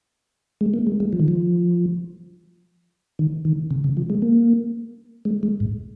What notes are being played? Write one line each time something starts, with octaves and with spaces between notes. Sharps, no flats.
G#3
A#3
G#3
G#3
F3
D#3
F3
D#3
D#3
C#3
C#3
F3
G#3
A#3
G#3
G#3
G#2